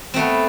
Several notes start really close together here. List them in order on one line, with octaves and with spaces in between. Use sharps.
C4 A3 B3